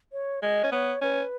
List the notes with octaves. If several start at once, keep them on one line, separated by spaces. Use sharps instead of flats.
C#5
G#3 D#5
C#4
B3 C#5
C#4 B4